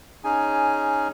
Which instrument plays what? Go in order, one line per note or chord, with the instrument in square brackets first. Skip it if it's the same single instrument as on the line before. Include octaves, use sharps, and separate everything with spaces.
[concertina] C#4 D#4 G#4 G#5